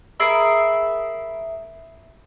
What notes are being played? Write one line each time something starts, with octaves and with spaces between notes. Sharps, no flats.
G#4 A#4 E5 B5